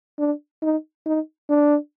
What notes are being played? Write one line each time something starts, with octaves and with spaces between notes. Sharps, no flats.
D4
D#4
D#4
D4